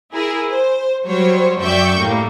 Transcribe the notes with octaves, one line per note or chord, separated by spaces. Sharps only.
E4 G#4 A#4
C5
F#3 G3 C5 C#5
F#2 D5 E5 G5 C#6 G6
A2 G3 A#3